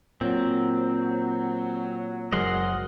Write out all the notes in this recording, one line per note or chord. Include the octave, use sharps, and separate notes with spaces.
A#2 F#3 C4
F#1 G#2 F#3 G#3 A#4 D#5 F#5 C6